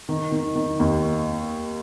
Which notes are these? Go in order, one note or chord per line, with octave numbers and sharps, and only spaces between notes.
D#3
D#3
D#3
D#2